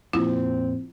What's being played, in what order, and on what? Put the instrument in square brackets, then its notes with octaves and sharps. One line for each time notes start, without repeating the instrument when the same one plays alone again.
[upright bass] F2 A#2 [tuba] C4 [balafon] E4 F4